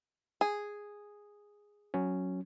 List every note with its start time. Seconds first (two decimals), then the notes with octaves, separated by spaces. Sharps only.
0.41 G#4
1.94 F#3 C#4